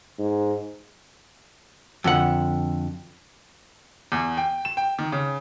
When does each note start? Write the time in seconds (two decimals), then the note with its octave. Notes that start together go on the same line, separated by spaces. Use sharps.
0.19 G#2
2.04 F2 D3 F#5
4.12 E2
4.37 G5
4.65 E7
4.77 G5
4.99 D#3
5.12 C#3